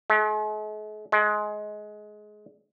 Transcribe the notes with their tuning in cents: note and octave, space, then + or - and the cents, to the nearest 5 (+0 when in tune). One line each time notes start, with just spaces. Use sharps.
G#3 +45
G#3 +20